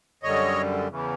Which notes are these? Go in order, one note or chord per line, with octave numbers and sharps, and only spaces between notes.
F#2 D3 G3 C#5 D#5
E2 C#3 E3